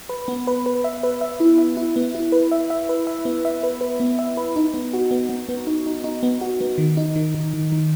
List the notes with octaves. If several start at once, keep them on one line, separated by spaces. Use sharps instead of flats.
B4
B3
B4
B4
E5
B4
E5
E4
E5
E4
B3
E4
B4
E5
E5
B4
E5
B3
E5
B4
B4
B3
E5
B4
D#4
B3
F#4
B3
B3
B3
D#4
D#4
D#4
B3
F#4
B3
D#3
D#4
D#3
D#3
D#3
D#3